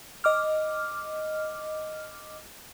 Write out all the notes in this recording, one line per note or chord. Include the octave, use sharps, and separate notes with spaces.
D#5 D6 F6